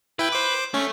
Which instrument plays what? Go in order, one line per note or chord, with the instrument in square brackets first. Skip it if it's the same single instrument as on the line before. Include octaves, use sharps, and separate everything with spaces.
[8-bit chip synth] E4 G5 [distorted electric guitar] B4
[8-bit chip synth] C5 D6
[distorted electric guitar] A3 [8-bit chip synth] C#4